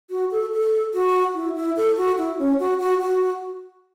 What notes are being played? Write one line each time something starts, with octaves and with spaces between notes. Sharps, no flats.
F#4
A4
A4
F#4
E4
E4
A4
F#4
E4
C#4
F#4
F#4
F#4